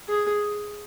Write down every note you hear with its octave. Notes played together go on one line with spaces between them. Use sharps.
G#4